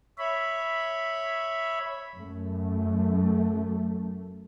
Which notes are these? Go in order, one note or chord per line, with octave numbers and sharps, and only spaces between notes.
C#5 E5 B5
F#2 A3